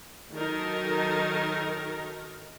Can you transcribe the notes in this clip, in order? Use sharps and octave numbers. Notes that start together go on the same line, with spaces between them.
D#3 F#3 D#4 A4 A#4